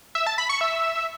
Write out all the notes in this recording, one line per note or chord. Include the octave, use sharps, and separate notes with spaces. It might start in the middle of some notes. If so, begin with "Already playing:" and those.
E5
A5
B5
C#6
E5